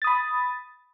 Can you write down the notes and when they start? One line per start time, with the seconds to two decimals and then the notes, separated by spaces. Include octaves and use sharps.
0.02 A6
0.04 D#6
0.07 B5